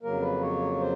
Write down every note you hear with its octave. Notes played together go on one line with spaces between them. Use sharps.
F2 C#3 F#3 A#3 A#4
B4
C#5
C5